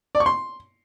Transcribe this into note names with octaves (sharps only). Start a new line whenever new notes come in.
D5
C#6
C6